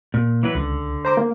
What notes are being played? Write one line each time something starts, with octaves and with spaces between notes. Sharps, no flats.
A#2
E3 F#3 B4
C#2 D3
C5 A#5 D6
A#3